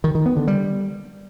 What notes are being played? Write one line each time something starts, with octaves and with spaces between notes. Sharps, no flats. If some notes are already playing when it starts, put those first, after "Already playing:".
D#3
D#3
B3
D3
G3